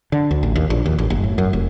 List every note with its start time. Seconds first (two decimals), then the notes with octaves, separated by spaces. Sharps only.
0.12 D3
0.31 D2
0.43 A1
0.56 D#2
0.70 A#1
0.86 D#2
0.98 A1
1.10 F#1
1.23 A2
1.38 F#2
1.53 F1